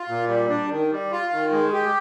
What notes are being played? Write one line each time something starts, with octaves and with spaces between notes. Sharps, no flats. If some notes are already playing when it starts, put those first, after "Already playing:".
Already playing: F4
A#2
G3
D4
D#3
G3
F4
D#3
G#3
G4